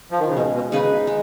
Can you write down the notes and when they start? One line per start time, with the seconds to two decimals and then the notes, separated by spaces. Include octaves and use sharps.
0.11 F3
0.20 D#3
0.28 C#3
0.36 B2 G#3
0.54 B2
0.72 C#3 D#4 G#4 B4
1.07 G#3